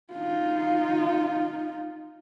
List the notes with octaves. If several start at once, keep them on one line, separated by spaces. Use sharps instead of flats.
D#4 F4